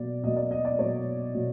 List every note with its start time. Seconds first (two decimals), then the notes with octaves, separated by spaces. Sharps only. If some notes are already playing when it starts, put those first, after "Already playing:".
Already playing: B2 F#3 A#3 D5
0.23 B2 F#3 A#3 D#5
0.36 D5
0.51 D#5
0.65 D5
0.78 B2 F#3 A#3 C#5
1.34 B2 F#3 A#3